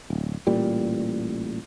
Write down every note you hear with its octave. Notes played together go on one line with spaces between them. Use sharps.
D1
A1 A#2 G3